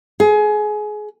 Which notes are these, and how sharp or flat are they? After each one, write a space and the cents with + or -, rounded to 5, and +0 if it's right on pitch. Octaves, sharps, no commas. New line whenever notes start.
G#4 +25